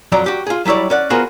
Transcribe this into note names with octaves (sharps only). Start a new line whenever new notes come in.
F2 F#3 D5 A#5
F#4 G4
F4 G#4
F#3 G3 E4 C#5 D5
C#4 D5 F#5
B3 F4 F#4 G#4 A#4 C5